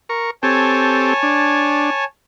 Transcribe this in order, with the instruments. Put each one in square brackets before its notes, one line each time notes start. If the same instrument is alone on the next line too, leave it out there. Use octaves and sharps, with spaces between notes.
[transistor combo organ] A#4 C#6
[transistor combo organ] C4 G4 A4 [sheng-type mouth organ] C#5 G#5 A5
[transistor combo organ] D4